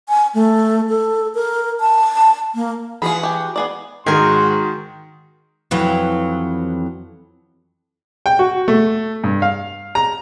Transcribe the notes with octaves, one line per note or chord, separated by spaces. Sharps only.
G#5
A3
A4
A#4
A5
A#3
E3 F4 F#4 G#4 B5
G4 G#5
B3 G#4 D5
G#2 D#3 F#4 G#4 A#4 G#5 C6
F2 E3 F#3
G5
F#4
A3
G2
F5
A#5